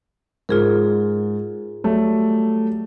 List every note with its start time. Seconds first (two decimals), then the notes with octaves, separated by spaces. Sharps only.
0.49 G#2 F4 G#4 A#4
1.84 F#3 G3 A3